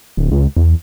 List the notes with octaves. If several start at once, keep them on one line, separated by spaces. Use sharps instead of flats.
D1
C#2
E2